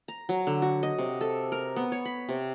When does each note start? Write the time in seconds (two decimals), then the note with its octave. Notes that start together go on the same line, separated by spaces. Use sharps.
0.08 A#5
0.29 F#3
0.47 D3
0.62 F#4
0.83 D#5
0.98 C3
1.21 A4
1.52 A#4
1.76 B3
1.92 C#5
2.05 B5
2.29 C3